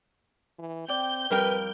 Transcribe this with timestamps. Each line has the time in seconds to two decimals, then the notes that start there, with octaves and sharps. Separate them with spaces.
0.59 E3
0.88 C4 D5 G5 G6
1.30 F2 G3 A#4 B4 G5